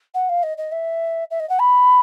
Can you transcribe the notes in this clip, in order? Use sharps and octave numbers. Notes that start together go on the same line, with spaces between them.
F#5
F5
D#5
D#5
E5
E5
D#5
F#5
B5